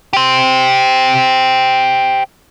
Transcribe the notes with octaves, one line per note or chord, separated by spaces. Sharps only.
G4 C5